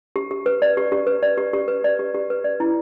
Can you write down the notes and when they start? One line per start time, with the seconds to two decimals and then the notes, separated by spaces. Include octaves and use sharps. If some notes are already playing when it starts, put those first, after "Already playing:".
0.16 G4
0.31 G4
0.46 B4
0.62 D5
0.77 G4
0.92 G4
1.07 B4
1.23 D5
1.38 G4
1.53 G4
1.68 B4
1.84 D5
1.99 G4
2.14 G4
2.30 B4
2.44 D5
2.60 E4